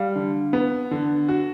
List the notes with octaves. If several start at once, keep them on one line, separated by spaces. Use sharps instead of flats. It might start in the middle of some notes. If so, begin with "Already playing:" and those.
Already playing: G3 F5
D3
B3
D3
F#4